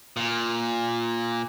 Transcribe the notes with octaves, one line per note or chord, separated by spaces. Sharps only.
A#2